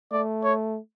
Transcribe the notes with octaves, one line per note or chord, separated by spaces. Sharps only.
A3 D5
C#5